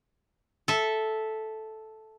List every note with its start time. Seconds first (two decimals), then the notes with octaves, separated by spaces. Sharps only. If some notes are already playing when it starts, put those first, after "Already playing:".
0.68 A4 E5